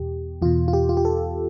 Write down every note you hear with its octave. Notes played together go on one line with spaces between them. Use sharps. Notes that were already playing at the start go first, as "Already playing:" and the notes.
Already playing: E2 B2 G4
E2 B2 F4
F4
G4
F4
G4
A4